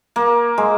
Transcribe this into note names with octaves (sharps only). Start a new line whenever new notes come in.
A#3
G#3